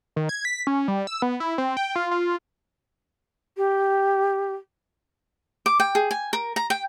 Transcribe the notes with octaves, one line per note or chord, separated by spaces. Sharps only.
D#3
G#6
B6
C#4
G3
E6
B3
E4
C4
G5
F4
F4
G4
D6
G5
G#4
G#5
A#4
A#5
G5